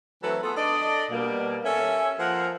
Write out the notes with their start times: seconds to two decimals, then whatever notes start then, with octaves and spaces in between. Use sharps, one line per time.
0.24 E3 F#3 A3 C4 A4 B4
0.43 B3 F4 G#4 A4
0.57 D4 A4 D5 D#5
1.11 B2 G3 A#3
1.64 C#4 A4 E5
2.19 F3 A#3 A#4 F#5